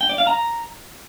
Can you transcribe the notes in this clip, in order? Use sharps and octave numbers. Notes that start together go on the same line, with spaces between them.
G5
D5
F5
A#5